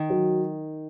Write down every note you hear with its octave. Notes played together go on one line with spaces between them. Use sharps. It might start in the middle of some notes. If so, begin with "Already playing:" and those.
Already playing: D#3
F#3